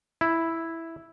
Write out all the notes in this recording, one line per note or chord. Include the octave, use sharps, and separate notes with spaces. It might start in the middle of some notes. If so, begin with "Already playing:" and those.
E4